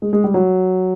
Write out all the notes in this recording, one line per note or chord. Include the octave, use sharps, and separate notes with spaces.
G#3
G#3
G3
F#3